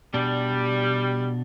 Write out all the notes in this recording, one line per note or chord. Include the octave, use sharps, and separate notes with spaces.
B2 G3 D4